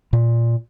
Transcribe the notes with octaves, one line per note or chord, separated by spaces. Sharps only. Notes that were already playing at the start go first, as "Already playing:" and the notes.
A#2